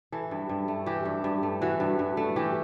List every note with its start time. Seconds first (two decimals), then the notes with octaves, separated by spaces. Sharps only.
0.12 E3 A4
0.31 G2
0.49 G2
0.68 A3
0.86 E3 G4
1.05 G2
1.24 G2
1.43 A3
1.62 E3 F#4
1.80 G2
1.99 G2
2.17 A3
2.36 E3 G4